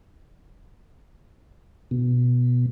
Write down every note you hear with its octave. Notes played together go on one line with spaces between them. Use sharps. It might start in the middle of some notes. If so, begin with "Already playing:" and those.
B2